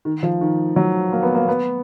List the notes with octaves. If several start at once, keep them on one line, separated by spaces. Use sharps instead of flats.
D#3
F3
D#3
F#3
A#3
B3
A#3
B3